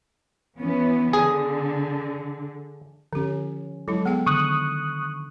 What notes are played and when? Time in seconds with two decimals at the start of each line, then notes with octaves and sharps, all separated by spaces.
0.59 E3 B3 C#4
1.13 D3 G#4
3.13 D3 F3 C#4 G4
3.88 F#3 G#3 E4 A4
4.06 B3 G#4 F#5 G5
4.26 D3 D#3 D4 C#6 D#6 F#6